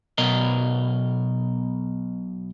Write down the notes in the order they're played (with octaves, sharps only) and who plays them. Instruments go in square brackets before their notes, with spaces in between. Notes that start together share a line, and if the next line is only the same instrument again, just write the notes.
[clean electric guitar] B1 B2 A#4 D#5